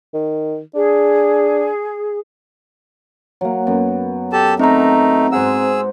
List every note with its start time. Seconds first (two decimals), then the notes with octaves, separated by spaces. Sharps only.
0.14 D#3
0.74 D4 G#4
3.41 F#3 A#3
3.67 F#2 B3
4.33 G4 A4 A5
4.59 A3 C4 D#4 A#5
5.32 G#2 G#4 C5 F#5 E6